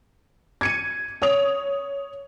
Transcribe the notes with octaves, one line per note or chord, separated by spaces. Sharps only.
G#6 C#7 D#7
C#5 D#6 F7